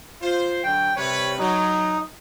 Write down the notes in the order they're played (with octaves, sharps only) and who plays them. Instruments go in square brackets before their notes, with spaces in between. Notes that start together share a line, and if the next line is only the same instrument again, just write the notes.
[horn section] F4 C5
[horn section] D3 F#3 [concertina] G5
[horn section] C3 G3 B4 [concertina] C#5
[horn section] F#3 [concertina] D#4